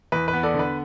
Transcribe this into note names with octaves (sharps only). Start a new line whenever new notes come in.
E2 B4
B4
B3
A4 D5
D3
B4